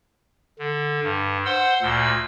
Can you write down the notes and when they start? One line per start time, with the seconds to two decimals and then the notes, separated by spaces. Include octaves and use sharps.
0.59 D3
1.03 G2
1.46 C5 F#5 C6 E6
1.82 D2 A#2 E6